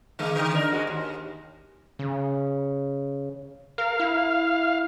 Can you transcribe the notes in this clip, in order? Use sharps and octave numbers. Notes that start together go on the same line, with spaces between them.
D3 G#3 A#3
D3
D4 D#4 A#4
G#2 G#3 F#4
D#2
C#3
A#4 F5
E4